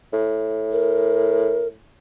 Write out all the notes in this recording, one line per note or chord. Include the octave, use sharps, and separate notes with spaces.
A2
A#4